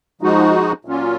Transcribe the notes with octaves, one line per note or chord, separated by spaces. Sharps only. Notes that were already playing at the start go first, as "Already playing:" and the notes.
F3 G#3 D#4 F#4
A#2 F#3 C#4 F4